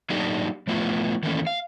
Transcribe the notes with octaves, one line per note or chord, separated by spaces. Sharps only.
F#3 A#3 D4 D#4 G4
F3 A3 B3 E4 F4
D#3 E3 A3 A#3 C#4
F5